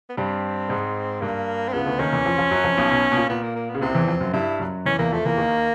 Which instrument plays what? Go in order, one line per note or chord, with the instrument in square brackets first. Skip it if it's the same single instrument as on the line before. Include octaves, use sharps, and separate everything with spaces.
[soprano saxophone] B3
[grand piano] G2 G3 [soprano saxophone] C4
[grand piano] G#2 G#3
[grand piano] G2 G3 [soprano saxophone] A#3
[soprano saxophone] C4
[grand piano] C#2 C#3 [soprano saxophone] B3
[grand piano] D2 D3
[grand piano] D#2 D#3 [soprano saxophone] C#4
[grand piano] E2 E3
F2 F3
F2 F3
F#2 F#3
F2 F3
B1 B2
B1 B2
B2
A#2
[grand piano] A#2 [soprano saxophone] B3
[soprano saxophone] A#3
A#3
B3
[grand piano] C#3
[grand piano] C2 C3 [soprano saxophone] C4
[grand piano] E2 E3
F2 F3
F#2 F#3
[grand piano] G2 G3 [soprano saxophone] E4
[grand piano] F#2 F#3
[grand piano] E2 E3 [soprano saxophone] C#4
[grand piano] E2 E3 [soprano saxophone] A#3
[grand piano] F2 F3 [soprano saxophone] A3
[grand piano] E2 E3 [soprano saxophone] A#3
[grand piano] D#2 D#3